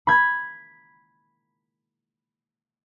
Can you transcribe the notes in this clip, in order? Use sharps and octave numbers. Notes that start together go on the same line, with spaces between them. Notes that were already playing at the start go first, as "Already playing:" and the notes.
B5 G#6